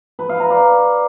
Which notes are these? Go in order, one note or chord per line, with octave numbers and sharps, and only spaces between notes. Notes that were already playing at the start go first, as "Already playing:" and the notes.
B4
F5
A#5
D5